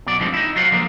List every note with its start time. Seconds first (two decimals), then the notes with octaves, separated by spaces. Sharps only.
0.06 B2 F#3 D5
0.20 D2 G2 F3 G3 G#3 C4
0.34 D#4 E4
0.56 F#3 F4 C5 F#5
0.71 D3 F3 G#3 A#3